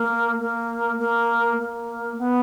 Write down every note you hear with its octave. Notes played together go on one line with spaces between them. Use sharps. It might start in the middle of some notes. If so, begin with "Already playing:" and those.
Already playing: A#3
A#3
A#3
A#3
B3